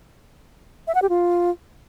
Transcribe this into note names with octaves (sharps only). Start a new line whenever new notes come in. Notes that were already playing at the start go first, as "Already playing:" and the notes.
E5
F#5
G4
F4